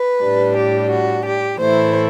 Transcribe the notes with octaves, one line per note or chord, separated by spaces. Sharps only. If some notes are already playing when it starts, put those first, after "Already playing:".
Already playing: B4
A2 G3 D4
G4
F#4
G4
A2 E3 A3 E4 C5